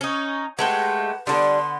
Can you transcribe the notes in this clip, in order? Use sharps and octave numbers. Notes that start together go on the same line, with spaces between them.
C#4 D#4
G#3 A3 G4 B4 F#5
D3 G3 B3 D4 C6